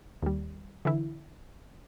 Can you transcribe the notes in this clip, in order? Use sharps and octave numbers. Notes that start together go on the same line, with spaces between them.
D#2 G3
D3 E3 E4